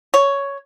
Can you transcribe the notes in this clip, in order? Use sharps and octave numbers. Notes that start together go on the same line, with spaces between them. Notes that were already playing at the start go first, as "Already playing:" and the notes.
C#5